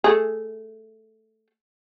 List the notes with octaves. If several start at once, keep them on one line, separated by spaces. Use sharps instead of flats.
A3 G#4